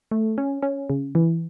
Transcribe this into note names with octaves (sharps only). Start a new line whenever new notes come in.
A3
C#4
C#4
C#3
E3